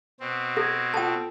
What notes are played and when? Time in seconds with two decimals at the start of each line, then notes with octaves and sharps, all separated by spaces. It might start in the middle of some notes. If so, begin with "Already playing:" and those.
0.20 B2 C4
0.57 A4 G#6 A#6
0.94 F4 A4 G5 A5